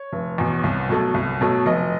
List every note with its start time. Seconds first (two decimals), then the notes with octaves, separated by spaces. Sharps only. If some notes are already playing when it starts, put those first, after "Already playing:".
Already playing: C#5
0.13 F1
0.38 E2 B2
0.63 C2
0.89 B2 F#3 A3
1.14 C2
1.41 B2 F#3 A3
1.66 F1 D#5